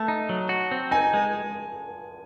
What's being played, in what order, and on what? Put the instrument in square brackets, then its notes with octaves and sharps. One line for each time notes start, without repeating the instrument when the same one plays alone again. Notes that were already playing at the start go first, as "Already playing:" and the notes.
Already playing: [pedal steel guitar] A3 [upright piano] A5
[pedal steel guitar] D#4
F#3
F#4
C4
[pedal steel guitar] D#4 [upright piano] G#5
[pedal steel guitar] G#3